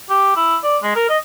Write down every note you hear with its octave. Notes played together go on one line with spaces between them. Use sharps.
G4
E4
D5
G#3
A#4
D#5